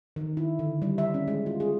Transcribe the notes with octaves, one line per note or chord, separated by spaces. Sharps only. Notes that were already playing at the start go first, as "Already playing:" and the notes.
D#3
E4
D3
G3
E5
C#4
G#3
F4
G#4